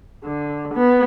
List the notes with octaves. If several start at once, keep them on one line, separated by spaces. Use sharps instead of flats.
D3
B3